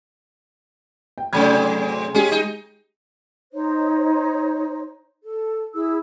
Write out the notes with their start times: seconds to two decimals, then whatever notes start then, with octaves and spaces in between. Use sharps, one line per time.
1.18 G5
1.33 G#2 C3 F#3 A3 B5 G#6
2.14 G#3 C#4 G4 G#4
2.32 D#4
3.53 D#4 C5 C#5
5.24 A4
5.74 E4 G#4 E6